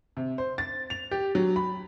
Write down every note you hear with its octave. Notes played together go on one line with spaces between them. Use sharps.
C3
C5
A6
F7
G4
F#3
B5